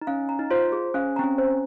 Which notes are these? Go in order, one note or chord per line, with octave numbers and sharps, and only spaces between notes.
D#4
C#4 F5
A#5
D#4
F4 C5
G#4
C#4 F5
C4 A#5
C#4
C5